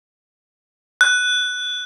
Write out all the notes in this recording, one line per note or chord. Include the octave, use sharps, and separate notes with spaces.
F#6